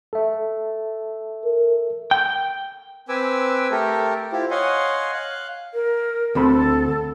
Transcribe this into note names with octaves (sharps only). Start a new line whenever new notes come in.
A4 E5
A#4
G5
C4 B4 G#5 D6 E6
A3 G4 A4 A#4
E4 F4 G4 C5
C#5 D#5 F5 F#5 G#5 C6
F5 F#6
A#4
D2 C4 A4 B5